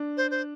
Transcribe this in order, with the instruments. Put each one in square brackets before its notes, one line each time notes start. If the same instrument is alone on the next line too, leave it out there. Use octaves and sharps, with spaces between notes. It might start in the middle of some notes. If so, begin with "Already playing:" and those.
Already playing: [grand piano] D4
[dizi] C5
C5